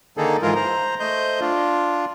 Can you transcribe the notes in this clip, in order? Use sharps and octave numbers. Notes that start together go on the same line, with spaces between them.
D3 D#3 A#3 D#4 G#4 A4
G#2 E3 G#3 F4 A#4
C5 A#5
A3 C5 D#5 G6
D4 F4